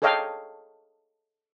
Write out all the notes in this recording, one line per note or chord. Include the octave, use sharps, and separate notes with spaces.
G#4 A4 C#5 D#5 F5 G5